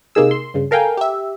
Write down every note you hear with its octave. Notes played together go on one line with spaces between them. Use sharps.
C3 A#3 D#4 G#4 E6
C6
G2 C#3
A4 A#4 F5 G5 G#5
G4 E5